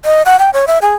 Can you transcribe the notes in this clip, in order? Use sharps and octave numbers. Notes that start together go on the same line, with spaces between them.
D#5
F#5
G5
C#5
E5
G#4